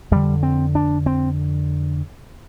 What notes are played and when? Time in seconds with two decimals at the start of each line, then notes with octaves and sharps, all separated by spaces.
0.11 F2 D3 G3
0.43 C4
0.75 D4
1.06 C4